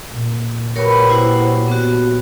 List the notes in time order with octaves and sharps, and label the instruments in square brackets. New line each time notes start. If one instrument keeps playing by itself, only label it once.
[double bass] A#2
[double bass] A#2 [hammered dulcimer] F#3 G4 B4 [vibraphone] A#4 C#5
[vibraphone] E4 C5 F#5
B3 F#4